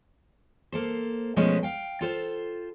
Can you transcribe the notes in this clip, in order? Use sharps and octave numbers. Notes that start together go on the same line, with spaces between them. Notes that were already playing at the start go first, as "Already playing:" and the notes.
A#3 A4 C5
B2 F3 G#3 A3 B3 C#4
F5 G5
F4 A4 C5